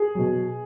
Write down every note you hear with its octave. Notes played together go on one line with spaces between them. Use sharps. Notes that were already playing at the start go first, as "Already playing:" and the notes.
Already playing: G#4
B2 F#3